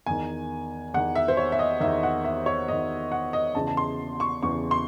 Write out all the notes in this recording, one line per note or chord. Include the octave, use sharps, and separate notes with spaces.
E2 D#3 G#5
E2 D#3 F#5
E5
C5
C#5
E5
D#5
E2 D#3 E5
F#5
E5
C#5
E2 D#3 D#5
F#5
D#5
E2 C#3 E3 A5
A5
C6
C#6
E2 C#3 E3 C#6
C6